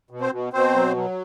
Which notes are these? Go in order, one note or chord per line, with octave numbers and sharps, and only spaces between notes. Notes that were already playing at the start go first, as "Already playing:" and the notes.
B2
C4 C5
B2
B2 C4 C5
F#3
F#3